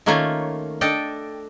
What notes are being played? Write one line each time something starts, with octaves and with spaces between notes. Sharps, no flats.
D#3 A3 A#3 C#4 F4 C#5
D4 A4 D#5 G5